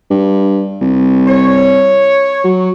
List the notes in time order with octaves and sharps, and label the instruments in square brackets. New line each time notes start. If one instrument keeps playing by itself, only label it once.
[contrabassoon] G2
C2
[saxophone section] C#5
[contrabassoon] F#3